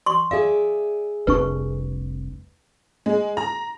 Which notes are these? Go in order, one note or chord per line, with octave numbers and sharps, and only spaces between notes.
C6 C#6
G#4 D5 E5 F5
F1 C2 D4 B4 C#6
G#3
A#5